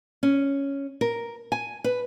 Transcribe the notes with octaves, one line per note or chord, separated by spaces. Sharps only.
C#4
A#4
G#5
B4